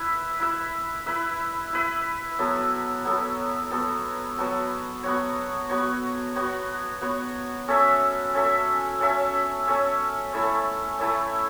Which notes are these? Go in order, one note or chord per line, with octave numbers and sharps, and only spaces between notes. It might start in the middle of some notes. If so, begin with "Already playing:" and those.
Already playing: E4 B4 E5
E4 B4 E5
E4 B4 E5
E4 B4 E5
F#3 B3 A4
F#3 B3 A4
F#3 B3 A4
F#3 B3 A4
B3 F#4 C#5
B3 F#4 C#5
B3 F#4 C#5
B3 F#4 C#5
C#4 A4 C#5 E5
C#4 A4 C#5 E5
C#4 A4 C#5 E5
C#4 A4 C#5 E5
A3 E4 A4 C#5
A3 E4 A4 C#5